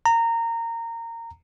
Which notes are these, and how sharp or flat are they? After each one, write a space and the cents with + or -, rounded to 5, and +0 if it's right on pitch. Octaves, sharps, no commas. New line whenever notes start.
A#5 -20